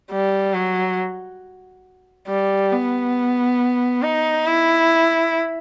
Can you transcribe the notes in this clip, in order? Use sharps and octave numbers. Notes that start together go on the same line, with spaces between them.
G3
F#3
G3
B3
D#4
E4